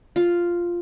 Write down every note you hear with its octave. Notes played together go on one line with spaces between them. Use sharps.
F4